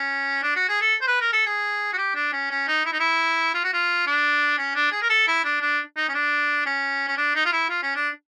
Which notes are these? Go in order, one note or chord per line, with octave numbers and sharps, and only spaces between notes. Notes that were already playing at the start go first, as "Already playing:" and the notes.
Already playing: C#4
D4
F#4
G#4
A4
C5
B4
A#4
A4
G#4
F#4
G4
D4
C#4
C#4
D#4
E4
D#4
E4
F4
F#4
F4
D4
C#4
D4
G#4
A#4
A4
E4
D4
D4
D#4
C#4
D4
C#4
C#4
D4
D#4
F4
E4
F4
C#4
D4